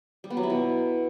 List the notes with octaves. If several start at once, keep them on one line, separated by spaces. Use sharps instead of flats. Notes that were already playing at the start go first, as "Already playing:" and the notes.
G3
B3
F#3
E4
B2